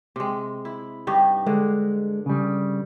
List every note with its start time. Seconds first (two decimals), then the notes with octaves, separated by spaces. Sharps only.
0.16 C3 G#3
0.65 E4
1.07 G2 D#4 G4
1.46 D3 G#3
2.26 C#3 G3